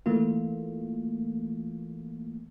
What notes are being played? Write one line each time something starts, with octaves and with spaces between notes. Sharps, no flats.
E3 A3 A#3 F4